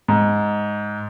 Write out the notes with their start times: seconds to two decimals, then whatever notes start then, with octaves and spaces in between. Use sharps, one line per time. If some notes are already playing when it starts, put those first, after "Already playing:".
0.08 G#2